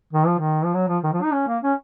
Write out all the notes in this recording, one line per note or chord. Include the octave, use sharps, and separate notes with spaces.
D#3
F3
D#3
F3
F#3
F3
D#3
F3
D#4
C#4
A#3
C#4